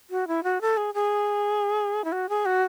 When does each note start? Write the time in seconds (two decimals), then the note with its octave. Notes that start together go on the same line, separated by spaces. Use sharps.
0.10 F#4
0.28 E4
0.44 F#4
0.61 A4
0.77 G#4
0.94 G#4
2.04 E4
2.12 F#4
2.29 G#4
2.46 F#4